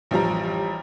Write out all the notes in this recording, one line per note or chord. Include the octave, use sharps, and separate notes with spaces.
A1 F3 G3 A#5